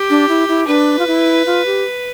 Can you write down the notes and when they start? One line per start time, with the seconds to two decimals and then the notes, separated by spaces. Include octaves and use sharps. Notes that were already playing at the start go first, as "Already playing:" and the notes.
Already playing: G4
0.10 D4
0.29 E4
0.49 E4
0.67 D4 B4
0.99 F4
1.07 E4
1.46 F4
1.66 G4